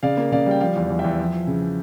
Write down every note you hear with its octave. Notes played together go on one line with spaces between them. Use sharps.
C#3 D5 F5
A#3
C#3 D5 F5
G3 G5
F3 D5 F5
E2
E2
E5 G5
E2
F3
F3
C#3
C#3